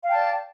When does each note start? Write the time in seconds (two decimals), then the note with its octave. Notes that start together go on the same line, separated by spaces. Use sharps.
0.03 F5
0.07 G5
0.10 A5
0.14 D5